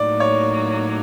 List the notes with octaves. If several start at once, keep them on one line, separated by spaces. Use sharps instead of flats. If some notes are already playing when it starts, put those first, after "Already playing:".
Already playing: A2 F#3 A#3 D#4 D5
C#5